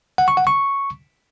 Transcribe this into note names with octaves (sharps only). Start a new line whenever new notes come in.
F#5
C#6
F#5
C#6